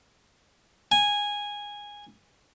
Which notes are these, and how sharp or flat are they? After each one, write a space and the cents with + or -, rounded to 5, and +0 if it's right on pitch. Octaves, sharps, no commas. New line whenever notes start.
G#5 -10